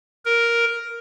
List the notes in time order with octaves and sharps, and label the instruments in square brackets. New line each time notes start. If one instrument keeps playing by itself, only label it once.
[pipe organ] A#4